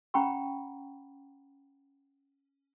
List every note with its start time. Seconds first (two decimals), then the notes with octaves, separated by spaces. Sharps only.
0.14 C#4 F#5 G5 A#5 B5 C#6